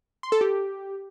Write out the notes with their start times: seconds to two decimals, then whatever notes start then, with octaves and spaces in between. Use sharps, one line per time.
0.23 C6
0.32 A4
0.41 G4